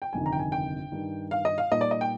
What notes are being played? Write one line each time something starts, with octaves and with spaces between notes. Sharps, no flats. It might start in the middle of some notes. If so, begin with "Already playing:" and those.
G5
G1 F2 C3 D#3 G#5
A#5
G5
G#5
G5
G2 D#3 G3
F5
D#5
F5
A#2 G3 A#3 D#4 D#5
D5
D#5
G5